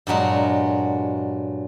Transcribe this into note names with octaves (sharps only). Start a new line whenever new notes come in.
G2 A#2 F#3 G#3